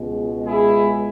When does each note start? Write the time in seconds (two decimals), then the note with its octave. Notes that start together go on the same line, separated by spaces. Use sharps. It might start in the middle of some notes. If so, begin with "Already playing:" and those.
Already playing: C#2 B2 G#3
0.46 E4 G#4